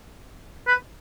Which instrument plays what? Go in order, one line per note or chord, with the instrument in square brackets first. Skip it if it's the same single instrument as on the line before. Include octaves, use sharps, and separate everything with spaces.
[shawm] B4